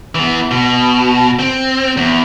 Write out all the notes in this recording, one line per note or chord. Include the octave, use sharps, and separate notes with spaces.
E3 B3
B2
C4
E2